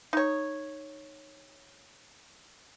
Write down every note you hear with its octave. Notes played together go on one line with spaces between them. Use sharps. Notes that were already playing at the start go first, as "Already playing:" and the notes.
D#4 C#5